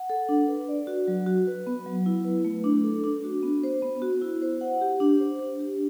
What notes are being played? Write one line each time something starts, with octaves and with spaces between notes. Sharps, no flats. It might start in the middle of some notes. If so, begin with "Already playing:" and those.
Already playing: F#5
A4
D4
B4
D5
F#4
F#3
F#4
B4
B3
F#3
E4
B4
A3
D4
A4
D4
F#4
B3
C5
B3
F#4
E4
C5
F#5
G4
D4
C5
D4
G4